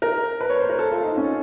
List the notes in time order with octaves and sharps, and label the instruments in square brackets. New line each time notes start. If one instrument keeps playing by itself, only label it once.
[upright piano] A#4
B4
C#5
C5
A#4
A4
F4
D#4
C#4